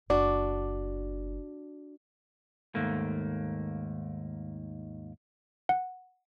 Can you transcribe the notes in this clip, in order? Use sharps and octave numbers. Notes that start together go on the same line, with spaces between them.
F#1 D4 F#4 D5
D#2 G#2 A3 A#3
F#5